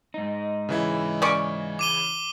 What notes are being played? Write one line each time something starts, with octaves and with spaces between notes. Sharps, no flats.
G#2 D#4
C#3 E3 E4
C#4 D5 C#6
D6 D#7 G7